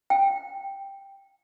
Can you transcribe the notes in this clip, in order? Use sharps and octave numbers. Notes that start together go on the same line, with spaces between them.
G5